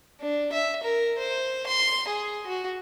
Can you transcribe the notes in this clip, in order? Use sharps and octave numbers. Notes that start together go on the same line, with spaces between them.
D4
E5
A#4
C5
C6
G#4
F#4